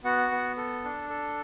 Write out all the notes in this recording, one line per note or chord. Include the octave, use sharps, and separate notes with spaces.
B3 F#4 F#5
B3
A4
D4
A4